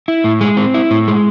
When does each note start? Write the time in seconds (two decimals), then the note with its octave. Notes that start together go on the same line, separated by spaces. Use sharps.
0.08 E4
0.24 A2
0.41 G#3
0.57 C4
0.74 E4
0.91 A2
1.08 G#3